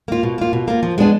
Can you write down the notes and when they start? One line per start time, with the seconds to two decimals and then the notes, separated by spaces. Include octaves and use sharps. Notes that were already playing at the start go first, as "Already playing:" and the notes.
0.08 A#3 F4
0.23 B2
0.38 A#3 F4
0.53 B2
0.68 A#3 F4
0.83 F3
0.98 G#3 B3 D4 G#4